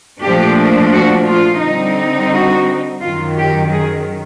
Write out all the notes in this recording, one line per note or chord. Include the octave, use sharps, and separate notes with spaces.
A#2 F3 A3 D4 G4
F#4
F4
D3 G3 C4 D#4
F#4
F#2 D#3 F#3 F4
G4
G#4